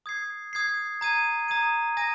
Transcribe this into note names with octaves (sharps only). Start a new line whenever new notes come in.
D#6 G#6 C7
D#6 G#6 C7
A#5 D#6 G#6 D#7
A#5 D#6 G#6 D#7
G#5 D#6 A#6 D#7